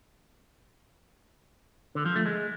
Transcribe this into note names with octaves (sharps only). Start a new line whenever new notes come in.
D3
F3
A3
G#3